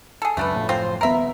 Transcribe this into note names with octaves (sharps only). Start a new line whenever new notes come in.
G#4 A4
C#2 F#2 A3 D4 B4
F#1 F2 A2
C4 F4 C5
D#1 B3 A#4 E5